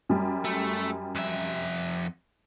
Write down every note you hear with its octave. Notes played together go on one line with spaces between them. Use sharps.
F#2 G3
A3
F2 E5